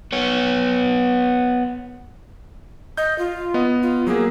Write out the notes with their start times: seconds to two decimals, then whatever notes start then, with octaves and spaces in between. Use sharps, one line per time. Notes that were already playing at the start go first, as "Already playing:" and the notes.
0.13 B3 C#5
2.97 D#5 G6
3.19 F4
3.54 B3 D#5
3.83 F4
4.07 F#3 A#3 G#4